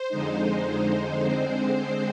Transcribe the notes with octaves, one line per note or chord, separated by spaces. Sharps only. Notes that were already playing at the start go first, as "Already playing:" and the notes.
Already playing: C5
F2 D3 G#3 D#4
D3 G#3 C4 C5
C5